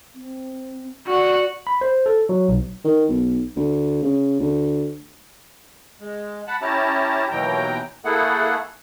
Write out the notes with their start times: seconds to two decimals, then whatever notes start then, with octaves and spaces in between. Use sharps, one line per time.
0.15 C4
1.07 F#4 D5 F#5
1.67 B5
1.81 C5
2.06 A4
2.29 F#3
2.49 B1
2.84 D#3
3.09 B1
3.56 D2
4.03 C#3
4.40 D2
6.01 G#3
6.47 F#5 A5 B5
6.62 C#4 E4 G4 A5 A#5
7.31 D#2 B2 E3 F#3 G5 A#5
8.05 A3 A#3 E4 G#4 A4 F#5